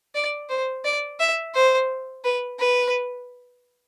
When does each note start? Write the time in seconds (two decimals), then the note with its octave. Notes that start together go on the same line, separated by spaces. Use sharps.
0.15 D5
0.49 C5
0.84 D5
1.20 E5
1.55 C5
2.24 B4
2.59 B4